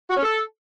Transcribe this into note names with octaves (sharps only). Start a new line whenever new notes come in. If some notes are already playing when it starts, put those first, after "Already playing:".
F#4
C#4
A4